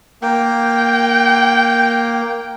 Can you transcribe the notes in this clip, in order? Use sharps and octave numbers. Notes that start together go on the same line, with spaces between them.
A#3 G5